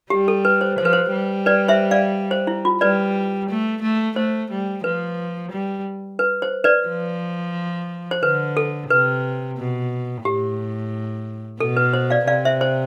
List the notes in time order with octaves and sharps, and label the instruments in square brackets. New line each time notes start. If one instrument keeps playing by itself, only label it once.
[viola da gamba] G3 [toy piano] G4
[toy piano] A4
B4
C5
[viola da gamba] F3 [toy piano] C5
[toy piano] B4
C5
[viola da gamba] G3
[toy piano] B4 D5
C5 E5
D5 F5
C5
E4
F4
[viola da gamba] G3 [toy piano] B4 D5
[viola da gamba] A3
A3
[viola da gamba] A3 [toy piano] C5
[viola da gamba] G3
[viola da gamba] F3 [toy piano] B4
[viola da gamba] G3
[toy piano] B4
C5
B4 D5
[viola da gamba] F3
[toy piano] C5
[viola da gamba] D3 [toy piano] B4
[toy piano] A4
[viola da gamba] C3 [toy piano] B4
[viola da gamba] B2
[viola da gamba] A2 [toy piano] G4
[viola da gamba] B2 [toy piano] A4
[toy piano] B4
C5
D5 F5
[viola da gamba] C3 [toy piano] D5 F5
[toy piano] C5 E5
C5